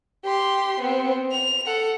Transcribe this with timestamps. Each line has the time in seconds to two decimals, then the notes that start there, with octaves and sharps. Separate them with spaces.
0.25 G4 C6
0.80 B3 C4
1.31 F7
1.66 A4 F#5